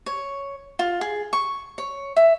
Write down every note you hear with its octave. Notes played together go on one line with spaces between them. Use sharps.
C#5
F4
G#4
C#6
C#5
E5